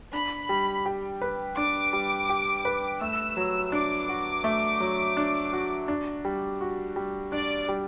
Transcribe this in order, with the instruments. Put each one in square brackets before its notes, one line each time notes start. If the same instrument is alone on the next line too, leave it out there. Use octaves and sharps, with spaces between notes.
[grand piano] D4 [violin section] B5
[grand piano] G3
G4
B4
[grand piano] D4 [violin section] D6
[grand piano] G3
G4
B4
[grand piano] A3 [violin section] E6
[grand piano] F#3
[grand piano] D4 [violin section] D6
[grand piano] F#4
A3
F#3
D4
F#4
D4
G3
F#4
G3
[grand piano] D4 [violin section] D5
[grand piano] G3